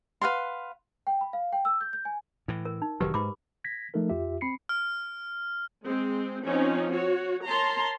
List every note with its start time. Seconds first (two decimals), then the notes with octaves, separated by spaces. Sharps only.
0.22 B4 F5 F#5 C6
1.07 G5
1.21 B5
1.33 F5
1.53 G5
1.65 E6
1.81 G6
1.93 G6
2.05 G#5
2.48 A2 E3
2.65 A#4
2.82 D#4
3.00 E1 D#3 F#3 G4 A#4 B4
3.14 G#2 B5 D6
3.64 G#6 A#6 B6
3.94 F3 A3 D#4 A4 A#4
4.10 F2 F4 G4 E5
4.41 C4 B5 C7 C#7
4.69 F6
5.84 G#3 C4
6.46 F3 C4 C#4 D#4
6.92 F#4 C#5
7.46 A#4 C#5 A5 A#5 C6